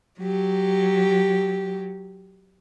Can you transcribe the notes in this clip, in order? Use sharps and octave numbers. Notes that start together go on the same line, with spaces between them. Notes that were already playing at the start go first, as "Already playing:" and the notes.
F#3 G4